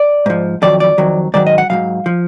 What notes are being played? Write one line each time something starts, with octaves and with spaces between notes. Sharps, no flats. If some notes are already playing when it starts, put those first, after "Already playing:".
Already playing: D5
G#2 F3
F2 D#3 F#3 D5
D5
F2 D#3 F#3
G#2 D#3 F#3 D5
D#5
F#5
G#2 D#3 F#3 F5
F3